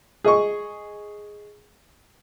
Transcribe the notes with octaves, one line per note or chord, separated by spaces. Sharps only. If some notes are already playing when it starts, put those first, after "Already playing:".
G#4 D#5 C#6